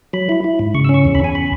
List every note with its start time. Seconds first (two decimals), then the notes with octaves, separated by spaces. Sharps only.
0.13 F#3 B5
0.29 E4
0.44 E4
0.59 G#2
0.75 C#3 C#6
0.85 E6
0.89 C#4
0.94 C#6
1.04 E2
1.15 B5
1.19 E2
1.24 G#5
1.35 B5